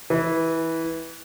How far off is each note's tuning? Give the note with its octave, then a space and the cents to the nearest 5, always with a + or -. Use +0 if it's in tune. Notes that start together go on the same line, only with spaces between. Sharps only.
E3 -15